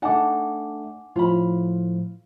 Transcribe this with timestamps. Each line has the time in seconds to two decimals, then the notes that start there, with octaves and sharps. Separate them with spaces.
0.02 A3 D4 D#4 F#5 G#5 A5 D6
1.16 A2 F3 F4 B5